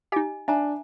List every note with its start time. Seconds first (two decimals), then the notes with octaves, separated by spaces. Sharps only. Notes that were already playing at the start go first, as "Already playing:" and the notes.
0.12 D#4 G4 D#5 G#5
0.48 D4 E5 G#5 A#5